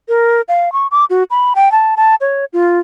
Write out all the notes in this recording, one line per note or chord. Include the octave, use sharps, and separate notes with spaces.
A#4
F5
C#6
D6
F#4
B5
G5
A5
A5
C#5
F4